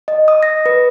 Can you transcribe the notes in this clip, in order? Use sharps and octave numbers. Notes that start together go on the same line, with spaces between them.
D#5
D#6
A#6
B4